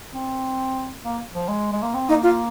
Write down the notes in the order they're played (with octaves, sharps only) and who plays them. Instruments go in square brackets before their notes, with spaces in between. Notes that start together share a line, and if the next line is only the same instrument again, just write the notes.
[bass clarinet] C4
A#3
F3
G#3
G#3
A#3
C4
[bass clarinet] A#3 [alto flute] D#4
[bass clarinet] A#3 [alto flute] F4